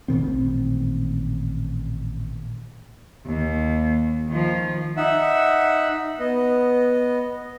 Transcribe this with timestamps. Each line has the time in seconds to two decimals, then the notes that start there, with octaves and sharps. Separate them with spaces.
0.08 A1 A#2 D#3 C4
3.26 D#2
4.28 D#3 F3
4.97 D#4 E5 F#5
6.20 B3 D#5